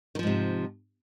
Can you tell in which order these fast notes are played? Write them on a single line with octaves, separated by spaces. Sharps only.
D#3 F3 G#2 C3